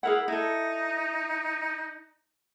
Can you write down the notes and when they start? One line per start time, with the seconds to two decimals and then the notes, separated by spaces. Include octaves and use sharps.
0.03 E4 G#4 A#4 F#5
0.28 D#4 E4 A4